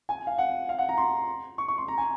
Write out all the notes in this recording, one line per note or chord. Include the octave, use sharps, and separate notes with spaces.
G#5
F5
F#5
F5
F#5
A#5
C6
C#6
C#6
C6
A#5
G#5